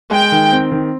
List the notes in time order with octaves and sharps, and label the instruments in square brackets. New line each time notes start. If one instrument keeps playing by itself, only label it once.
[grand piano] G#3 [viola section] G5
[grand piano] D#3
C4
D#3